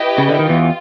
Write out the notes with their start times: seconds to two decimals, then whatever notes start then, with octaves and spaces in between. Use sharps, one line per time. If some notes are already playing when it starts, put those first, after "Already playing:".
Already playing: E4 G4 B4 D#5 G5
0.18 C#3
0.29 D3
0.39 D#3
0.49 E2 E3 F4